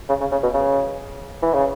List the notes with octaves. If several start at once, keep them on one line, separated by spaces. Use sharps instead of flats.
C#3
C#3
C#3
B2
C#3
E3
C#3